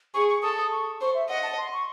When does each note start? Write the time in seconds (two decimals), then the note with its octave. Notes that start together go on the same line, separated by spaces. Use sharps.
0.14 G#4 C#6
0.29 C#6
0.42 A4 D#6
0.57 D#6
0.71 C#6
1.01 C5 C#6
1.14 E5
1.29 D#5 F#5
1.43 A5
1.58 C6
1.73 C#6